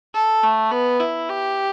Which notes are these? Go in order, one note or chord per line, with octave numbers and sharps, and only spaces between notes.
A4
A3
B3
E4
G4